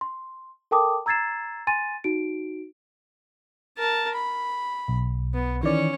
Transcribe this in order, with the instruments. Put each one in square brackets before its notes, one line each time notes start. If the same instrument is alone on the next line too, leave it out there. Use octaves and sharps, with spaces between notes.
[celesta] C6
A4 A#4 G5 A5 D6 D#6
A#5 E6 G#6 A6 C7 E7
G#5 C6 A6 D#7
D#4 F#4 D7
[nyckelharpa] A#4 A5
B5
[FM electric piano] B1
[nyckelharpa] B3
[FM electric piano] D#3 E3 D5 [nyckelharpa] C#4 C#5